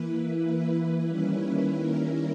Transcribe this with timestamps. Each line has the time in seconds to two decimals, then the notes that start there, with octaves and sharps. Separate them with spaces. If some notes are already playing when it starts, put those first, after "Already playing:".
Already playing: E3 A#3 E4 B4
0.37 B4
1.06 D#3 G3 A#3 C#4 E4
1.77 A#4